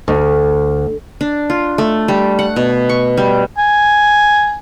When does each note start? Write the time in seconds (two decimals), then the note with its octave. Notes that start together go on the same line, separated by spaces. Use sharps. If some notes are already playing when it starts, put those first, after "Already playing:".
0.08 D2
1.21 D4
1.50 F4
1.78 A3
2.08 G3
2.39 F#5
2.56 B2
2.89 C#6
3.17 G3
3.58 G#5